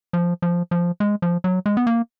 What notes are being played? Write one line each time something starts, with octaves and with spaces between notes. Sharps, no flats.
F3
F3
F3
G#3
F3
F#3
G#3
B3
A#3